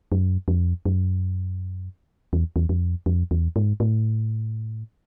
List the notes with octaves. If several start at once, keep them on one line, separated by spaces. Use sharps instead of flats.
F#2
F2
F#2
E2
E2
F2
F2
E2
G#2
A2